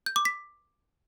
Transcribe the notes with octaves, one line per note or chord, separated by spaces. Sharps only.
G6
D6
B6